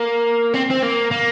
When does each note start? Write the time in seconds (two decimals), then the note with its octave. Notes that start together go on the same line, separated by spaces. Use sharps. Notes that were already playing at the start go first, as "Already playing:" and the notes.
Already playing: A#3
0.54 C4
0.70 C4
0.82 A#3
1.11 A#3